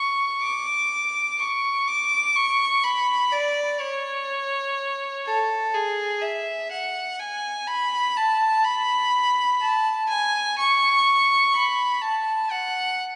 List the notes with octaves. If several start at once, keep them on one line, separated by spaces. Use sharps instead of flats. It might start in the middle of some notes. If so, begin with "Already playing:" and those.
Already playing: C#6
D6
C#6
D6
C#6
B5
D5
C#5
A4
G#4
E5
F#5
G#5
B5
A5
B5
A5
G#5
C#6
B5
A5
F#5